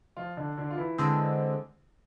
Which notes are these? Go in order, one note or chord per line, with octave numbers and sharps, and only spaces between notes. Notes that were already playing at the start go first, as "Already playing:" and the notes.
F3 F4
D3 D4
D3 D4
F4
E3 E4
D3 G#3 C4